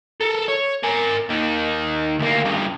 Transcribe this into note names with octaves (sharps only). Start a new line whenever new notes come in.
A4 A#4
C#5
A#4 G#5
D#2 D#3
D2 A#3
G2 C#3